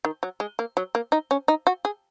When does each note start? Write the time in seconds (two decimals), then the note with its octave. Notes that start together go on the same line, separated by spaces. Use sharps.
0.05 D#3
0.23 F#3
0.40 G#3
0.59 A#3
0.77 F#3
0.95 A#3
1.12 D#4
1.31 C#4
1.48 D#4
1.67 F#4
1.85 G#4